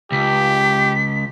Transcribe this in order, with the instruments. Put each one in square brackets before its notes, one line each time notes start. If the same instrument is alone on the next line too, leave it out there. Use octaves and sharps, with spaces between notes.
[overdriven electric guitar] C#2 [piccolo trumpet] G4 [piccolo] B6